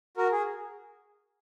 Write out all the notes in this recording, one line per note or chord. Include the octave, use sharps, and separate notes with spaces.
F#4 A#4
G#4